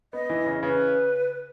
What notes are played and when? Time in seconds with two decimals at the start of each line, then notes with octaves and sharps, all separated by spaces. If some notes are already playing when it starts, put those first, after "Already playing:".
0.13 B3 D#5
0.30 E3
0.46 C#3
0.63 C#3 B4